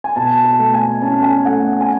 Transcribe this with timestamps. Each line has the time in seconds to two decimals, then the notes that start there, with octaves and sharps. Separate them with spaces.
0.04 G#5
0.16 B2 A5
0.45 A5
0.59 A3
0.74 G#5
1.01 C#4 A5
1.23 G#5
1.45 A3 F#5
1.81 G#5